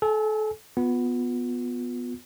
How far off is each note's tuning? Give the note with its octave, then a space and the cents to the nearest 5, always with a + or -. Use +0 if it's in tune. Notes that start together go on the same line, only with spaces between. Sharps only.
A4 -30 G#5 +0
B3 +0 F4 +30